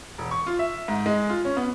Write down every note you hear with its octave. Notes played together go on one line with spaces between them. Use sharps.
E1
C#6
F4
E5
G#2
G#3
F4
C#4
B3